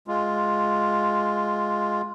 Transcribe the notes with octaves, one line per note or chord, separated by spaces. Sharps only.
G#3 F4